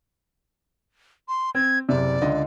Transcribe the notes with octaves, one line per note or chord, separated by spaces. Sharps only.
C6
C4 G#6
F#1 C3 D5
C#2 D3 D#5